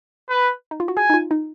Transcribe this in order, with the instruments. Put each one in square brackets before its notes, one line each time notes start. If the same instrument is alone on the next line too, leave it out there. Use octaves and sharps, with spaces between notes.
[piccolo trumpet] B4
[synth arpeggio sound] D#4
F4
F#4
[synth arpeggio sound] G#4 [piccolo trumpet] G#5
[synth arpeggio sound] D#4
F4
D#4